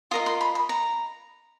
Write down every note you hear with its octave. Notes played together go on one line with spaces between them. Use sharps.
F4 A#4 D#5 D#6
C6
B5
B5
A#5